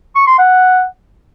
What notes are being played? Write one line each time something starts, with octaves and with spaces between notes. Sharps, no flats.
C#6
C6
F#5